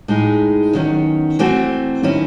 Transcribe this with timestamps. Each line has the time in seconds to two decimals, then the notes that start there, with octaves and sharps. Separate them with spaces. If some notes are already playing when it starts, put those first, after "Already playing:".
0.08 A2 G#3 D#4 G#4
0.73 E2 D#3 F#3 C#4
1.39 E3 A3 C4 F#4
2.03 D#3 F#3 C#4 E4